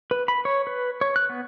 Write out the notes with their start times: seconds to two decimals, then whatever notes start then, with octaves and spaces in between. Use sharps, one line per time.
0.11 B4
0.28 B5
0.45 C#5
0.67 B4
1.01 C#5
1.16 F#6
1.29 B3